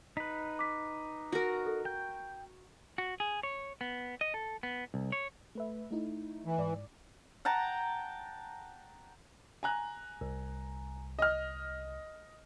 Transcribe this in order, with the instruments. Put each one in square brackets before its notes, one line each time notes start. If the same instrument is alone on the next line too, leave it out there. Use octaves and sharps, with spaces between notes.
[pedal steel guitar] D#4 B4 [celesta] B6
[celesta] D6 B6
[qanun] F#4 A#4
[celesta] A4
[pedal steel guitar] G5 [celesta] G6
[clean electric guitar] F#4
G#4
C#5
B3
D#5
A4
B3
C2
C#5
[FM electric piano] A3 B4 E5
A3 D#4 E4
[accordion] E3
[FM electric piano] G#2 D5
[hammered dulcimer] F#5 G5 A5 A#5
[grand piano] G#5 A#5 F#6
[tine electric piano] C2
[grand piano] D#5 F6